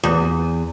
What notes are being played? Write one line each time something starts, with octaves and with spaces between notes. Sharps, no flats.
E2